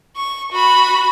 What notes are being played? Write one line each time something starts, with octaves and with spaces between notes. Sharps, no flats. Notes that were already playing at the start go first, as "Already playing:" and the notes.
C#6
F#4 B5